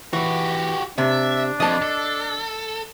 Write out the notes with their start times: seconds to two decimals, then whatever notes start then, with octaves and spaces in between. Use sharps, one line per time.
0.13 E3 F#4 G4
0.98 C3 D4 E5
1.60 F2 D#5 A5
1.82 A4